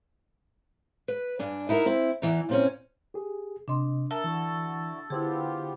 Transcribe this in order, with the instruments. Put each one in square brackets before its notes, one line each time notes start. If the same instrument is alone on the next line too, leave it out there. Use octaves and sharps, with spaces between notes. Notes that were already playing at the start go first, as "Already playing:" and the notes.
[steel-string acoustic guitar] B4
G2 D4 G#5
D#4 E4 F#4 A#4
C4 E4
E2 E3 D#4
A#2 C4 C#4
[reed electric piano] G4 G#4
[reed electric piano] C3 D#5 [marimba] D4 C6
[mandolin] A4 [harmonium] A#4 [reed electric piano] E5
[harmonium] D3 E4 F#4 [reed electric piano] E3
[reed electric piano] D3 C5 [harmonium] B3 F4 G4 [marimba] E4 G#4